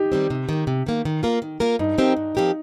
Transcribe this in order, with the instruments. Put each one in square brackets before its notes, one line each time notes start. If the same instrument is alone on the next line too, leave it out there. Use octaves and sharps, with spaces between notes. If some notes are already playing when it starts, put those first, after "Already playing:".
Already playing: [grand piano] D#4 G4
[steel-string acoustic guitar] D#3 G3 C4
C3
D#3 A#3
C3
D#3 A#3
D#3
A#3 F4 A#4
D#3
A#3 F4 A#4
[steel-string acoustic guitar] G2 [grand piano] D#4
[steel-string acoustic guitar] F3 C4 G4 A#4
G2
F3 C4 G4 A#4